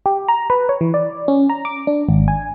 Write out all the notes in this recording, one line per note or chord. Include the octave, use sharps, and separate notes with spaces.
G4
A#5
B4
C#5
E3
D5
C#4
A#5
D6
D4
G#1
G#5